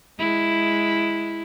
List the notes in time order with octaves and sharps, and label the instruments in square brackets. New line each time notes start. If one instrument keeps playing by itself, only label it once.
[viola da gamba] G#3 E4